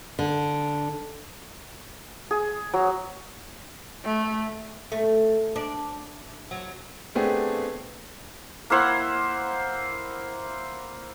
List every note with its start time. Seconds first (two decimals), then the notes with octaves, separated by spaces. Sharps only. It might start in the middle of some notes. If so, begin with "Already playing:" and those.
0.19 D3
2.31 G#4
2.74 F#3
4.05 A3
4.92 A3
5.56 D4
6.51 F#3
7.15 A3 B3 C4 D4 G4 G#4
8.70 A#3 E4 C5 F#5